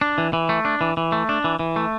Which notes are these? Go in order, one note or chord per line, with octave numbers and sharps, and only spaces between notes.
D4
E3
E3
A3
D4
E3
E3
A3
D4
E3
E3
A3